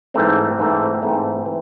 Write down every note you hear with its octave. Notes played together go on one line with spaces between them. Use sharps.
G#2 E3 A3 C4
G#2 E3 A3 C4
G#2 E3 A3 C4
E3